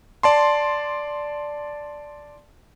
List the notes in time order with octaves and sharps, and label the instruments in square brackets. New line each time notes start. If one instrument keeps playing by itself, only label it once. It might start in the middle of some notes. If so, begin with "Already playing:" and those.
[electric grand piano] D5 A5 C6